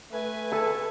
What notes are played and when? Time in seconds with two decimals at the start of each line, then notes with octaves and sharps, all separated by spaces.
0.12 A3 B4 G#5
0.52 A4 A5